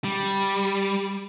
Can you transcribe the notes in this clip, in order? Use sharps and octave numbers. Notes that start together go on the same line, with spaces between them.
G3